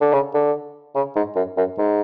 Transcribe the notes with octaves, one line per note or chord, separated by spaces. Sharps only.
D3
C#3
D3
C#3
G#2
F#2
F#2
G#2